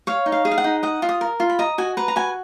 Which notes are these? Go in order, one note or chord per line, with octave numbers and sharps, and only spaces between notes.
C#5 F5
D#4
F5
G#4
F5
F#5
D#4
D#5 F#5
F4
D#6
A#4
F4
B5
D#5 A#5
F#4 G#5
B4 A#5
A#5
F#4 G#5